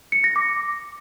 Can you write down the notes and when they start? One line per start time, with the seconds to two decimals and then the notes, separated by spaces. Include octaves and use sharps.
0.12 C#7
0.24 A#6
0.36 D6